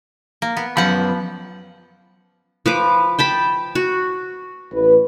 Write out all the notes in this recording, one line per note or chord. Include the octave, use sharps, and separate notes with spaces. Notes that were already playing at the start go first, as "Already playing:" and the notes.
A#3
B3
F#2 F3 B3 F#5 B5
F3 B4 D6
G5 A5 B5
F#4
A1 B4